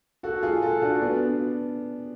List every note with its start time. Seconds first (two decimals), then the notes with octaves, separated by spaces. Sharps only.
0.23 F#4 A4
0.43 F4 G#4
0.62 F#4 A4
0.82 D4 F#4
1.01 B3 D4